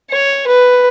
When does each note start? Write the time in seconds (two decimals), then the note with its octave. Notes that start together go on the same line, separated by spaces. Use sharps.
0.11 C#5
0.47 B4